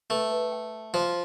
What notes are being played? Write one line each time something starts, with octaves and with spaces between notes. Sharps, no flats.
A3 B4
B4
G5
G5
F3 C5